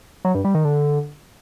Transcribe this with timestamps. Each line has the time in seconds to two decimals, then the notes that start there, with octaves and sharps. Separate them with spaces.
0.25 F#3
0.35 G2
0.45 G3
0.55 D#3
0.65 D3